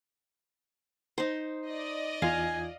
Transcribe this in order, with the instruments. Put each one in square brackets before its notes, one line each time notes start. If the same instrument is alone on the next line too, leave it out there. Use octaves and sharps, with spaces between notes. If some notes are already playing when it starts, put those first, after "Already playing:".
[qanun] D#4 C5
[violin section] D5 D#5
[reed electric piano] E2 F4 [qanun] F5 [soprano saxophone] G#5